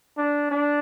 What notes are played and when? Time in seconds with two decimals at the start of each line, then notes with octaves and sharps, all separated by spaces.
0.17 D4
0.51 D4